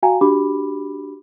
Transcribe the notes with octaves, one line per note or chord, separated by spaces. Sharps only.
F#4 F5 G5 G#5 A#5
D4 F#4 G4 B5 D6